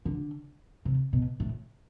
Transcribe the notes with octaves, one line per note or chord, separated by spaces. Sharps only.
D3
C3
B2
A2